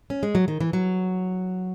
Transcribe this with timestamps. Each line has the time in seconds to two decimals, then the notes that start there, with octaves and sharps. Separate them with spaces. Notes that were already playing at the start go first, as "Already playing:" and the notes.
0.10 C#4
0.23 G#3
0.35 F#3
0.48 D#3
0.60 E3
0.73 F#3